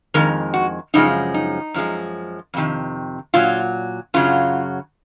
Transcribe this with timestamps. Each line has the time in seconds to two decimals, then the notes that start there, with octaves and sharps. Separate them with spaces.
0.14 F2 D#3 G#3 A#4
0.54 F#4
0.94 F#2 C#3 F3 G#3 D#4
1.34 D#4
1.74 F#2 F3 G#3
2.54 F2 C3 D#3
3.34 A#2 F#3 F4
4.14 F#2 C#3 F#3 F4